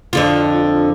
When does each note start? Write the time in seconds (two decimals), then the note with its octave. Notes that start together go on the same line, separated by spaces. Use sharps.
0.13 F2 D3 F4